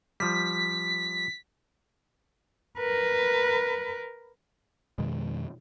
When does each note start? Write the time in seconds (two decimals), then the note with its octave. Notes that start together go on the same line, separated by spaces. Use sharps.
0.20 F3 G3 B6
2.78 A#4 B4
4.98 F2 B2 D#3 G#3